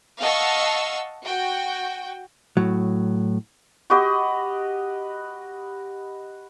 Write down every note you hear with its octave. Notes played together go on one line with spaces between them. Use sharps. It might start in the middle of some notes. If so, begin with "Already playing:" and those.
D#5 F5 F#5 A5 C#6 E6
F#4 G5
A2 F#3
F#4 G4 B4 D#5